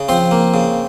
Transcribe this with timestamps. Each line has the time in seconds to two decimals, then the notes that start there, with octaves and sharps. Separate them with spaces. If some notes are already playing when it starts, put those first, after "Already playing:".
Already playing: C#3
0.09 F3 C4 C5
0.31 A#3
0.54 C#3